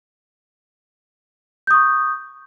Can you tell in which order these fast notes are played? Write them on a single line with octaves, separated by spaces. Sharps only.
G6 D#6 C#6